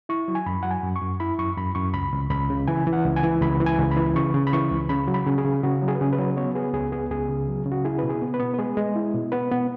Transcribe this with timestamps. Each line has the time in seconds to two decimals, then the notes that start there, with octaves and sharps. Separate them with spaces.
0.09 E4 C#6
0.28 F#3
0.35 G#5
0.46 F#2 B5
0.63 F#3 F#5
0.71 G#5
0.83 F#2
0.96 C#6
1.02 F#2
1.20 E4 B5
1.38 F#2 C#6
1.57 F#2 B5
1.75 F#2 C#6
1.94 C#2 B5
2.13 C#2
2.30 C#2 B5
2.50 C#3
2.67 E3 G#5
2.87 E3
2.93 F#5
3.05 C#2
3.16 G#5
3.23 E3
3.41 C#2 B5
3.61 E3
3.66 G#5
3.79 C#2
3.91 B5
3.97 E3
4.15 C#3 C#6
4.34 C#3
4.47 B5
4.53 E3 C#6
4.71 C#2
4.89 C#3 B5
5.08 F#3
5.14 B5
5.26 C#3
5.38 G#4
5.44 C#3
5.63 C#3 F#4
5.82 F#3
5.88 G#4
5.95 B4
6.01 C#3 G#4
6.13 B4
6.18 F#3
6.37 B3 C#5
6.55 B3 G#4
6.74 C#2 G#4
6.92 B3 G#4
7.10 C#2 G#4
7.29 C#3
7.48 F#3
7.66 C#3
7.72 F#4
7.85 E4 G#4
7.99 B2 B4
8.09 G#4
8.22 B3
8.34 B4
8.40 B3
8.54 B4
8.59 G#3 G#4
8.77 G#3
8.95 E4
9.14 B2
9.32 B3 B4
9.51 B3